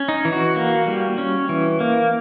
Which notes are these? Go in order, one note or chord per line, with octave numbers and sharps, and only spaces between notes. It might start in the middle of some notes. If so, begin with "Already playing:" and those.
Already playing: C#4
D#4
E3
F#4
A#3
G3
C#4
E3
A#3